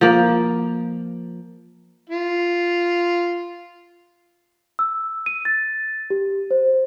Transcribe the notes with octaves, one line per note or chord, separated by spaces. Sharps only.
F3 A#3
F4
E6
D#7
A6
G4
C5